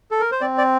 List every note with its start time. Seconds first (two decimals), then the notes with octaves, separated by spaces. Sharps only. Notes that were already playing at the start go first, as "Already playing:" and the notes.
0.11 A4
0.20 A#4
0.32 C5
0.41 C4 D5
0.58 D5